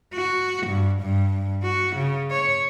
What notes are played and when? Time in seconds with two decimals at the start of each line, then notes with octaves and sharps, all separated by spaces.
0.14 F#4
0.67 G2
1.01 G2
1.62 F#4
1.96 C#3
2.30 C#5